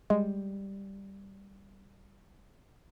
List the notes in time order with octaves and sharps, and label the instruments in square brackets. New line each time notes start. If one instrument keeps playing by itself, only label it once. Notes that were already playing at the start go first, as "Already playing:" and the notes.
[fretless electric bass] G3 [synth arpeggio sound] G#3